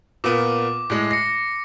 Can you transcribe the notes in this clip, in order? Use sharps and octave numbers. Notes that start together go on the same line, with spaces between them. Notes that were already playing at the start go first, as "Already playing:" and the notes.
A#2 A#3 B3 D6
A2 G#3
A#6 C7 C#7